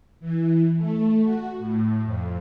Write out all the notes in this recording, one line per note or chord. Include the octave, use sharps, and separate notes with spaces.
E3
A3
F#4
A2
F2